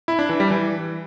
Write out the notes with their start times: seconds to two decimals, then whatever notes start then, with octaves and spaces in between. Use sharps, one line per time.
0.08 E4
0.19 D4
0.29 E3
0.40 G3
0.50 E3